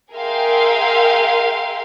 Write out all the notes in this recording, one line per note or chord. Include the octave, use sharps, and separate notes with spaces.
G#4 A#4 E5 F5 G5 C6